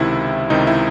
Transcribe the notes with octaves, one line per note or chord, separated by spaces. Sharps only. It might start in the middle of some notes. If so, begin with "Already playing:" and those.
Already playing: C#2 C3 D#3 E4
C#2 C3 D#3 D#4
E4